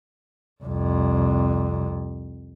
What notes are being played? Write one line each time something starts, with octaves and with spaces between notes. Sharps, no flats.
C2 F2